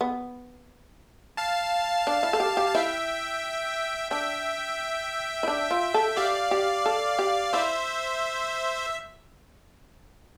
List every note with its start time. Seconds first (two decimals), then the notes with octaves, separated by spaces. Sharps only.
0.01 B3
1.37 F5 A5
2.07 D4
2.23 E4
2.33 A4
2.40 G4
2.57 G4
2.68 A5
2.75 E4 E5 G5
4.11 D4 E5 G5
5.43 E4
5.48 D4
5.71 F4
5.94 A4
6.17 G4 D5 F5
6.51 G4
6.86 A4
7.19 G4
7.53 E4 C5 E5